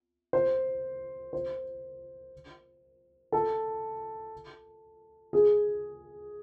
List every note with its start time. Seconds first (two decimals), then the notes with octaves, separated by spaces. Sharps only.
0.33 C5
1.33 C5
3.32 A4
5.33 G#4